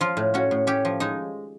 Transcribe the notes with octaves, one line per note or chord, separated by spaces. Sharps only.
F3 F4
A2
C#4 F#4
A2
C#4 G4
F3
G#3 D#4